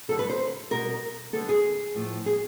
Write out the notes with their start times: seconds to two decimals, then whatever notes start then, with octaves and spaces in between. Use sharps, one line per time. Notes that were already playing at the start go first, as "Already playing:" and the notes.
0.08 G2 D3 F#3 B3 A4
0.19 B4
0.30 C5
0.71 B2 G3 B3 A#4
1.33 D#2 D3 G3 B3 A4
1.49 G#4
1.95 A2 F3 A#3
2.26 G#4